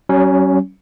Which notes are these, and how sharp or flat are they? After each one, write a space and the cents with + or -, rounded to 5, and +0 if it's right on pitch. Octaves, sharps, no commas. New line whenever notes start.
F#3 +40 C#4 +0